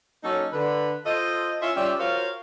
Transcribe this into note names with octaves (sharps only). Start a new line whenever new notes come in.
F#3 A#3 C#4 D#4 A4
D3 B4
F4 A4 C5 D#5
C#4 F4 E5
G3 C#4 F4 G4 D5 E5
F4 F#4 A#4 C5 C#5 F5